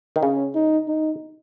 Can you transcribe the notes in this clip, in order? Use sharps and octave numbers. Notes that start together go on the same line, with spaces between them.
D#3
C#3 C#4
D#4
D#4